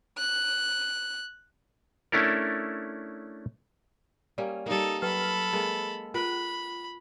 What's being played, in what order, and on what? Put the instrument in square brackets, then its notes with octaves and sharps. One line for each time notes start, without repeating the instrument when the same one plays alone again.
[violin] F#6
[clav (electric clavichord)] A3 C#4 D4 E4 A4 A#4
[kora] G3 A#3 C#4 [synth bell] D5
[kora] G3 A#3 [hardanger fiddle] D#4 A4
[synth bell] F#3 B4 F6 [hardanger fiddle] A4 B5
[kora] G#3 A#3 [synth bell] G#4
[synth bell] F4 [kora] A#4 B4 [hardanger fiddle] B5